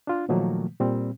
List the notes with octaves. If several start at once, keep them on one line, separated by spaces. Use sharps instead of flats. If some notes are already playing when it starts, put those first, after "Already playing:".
D4 F4
A#2 D#3 F3 F#3 A3 A#3
A#2 G3 C4